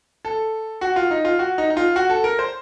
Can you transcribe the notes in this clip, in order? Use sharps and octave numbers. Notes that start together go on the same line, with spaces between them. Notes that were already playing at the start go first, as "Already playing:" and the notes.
A4
F#4
F4
D#4
F4
F#4
D#4
D#4
F4
F#4
A4
A#4
C5